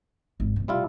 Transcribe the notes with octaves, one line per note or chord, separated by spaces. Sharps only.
G#1
F1 B2
G3 E4 F4